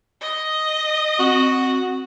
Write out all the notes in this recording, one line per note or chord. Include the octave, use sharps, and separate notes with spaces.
D#5
C4 F#4